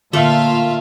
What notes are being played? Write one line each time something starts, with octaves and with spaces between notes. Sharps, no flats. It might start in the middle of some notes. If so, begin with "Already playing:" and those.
A#2 D3 A3 F4 E5 F5